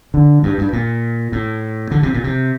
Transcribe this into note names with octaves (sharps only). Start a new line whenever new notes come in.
D3
G2
G2
A#2
A2
D3
C3
A#2
C3